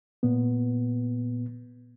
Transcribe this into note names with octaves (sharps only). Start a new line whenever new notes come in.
A#2 B3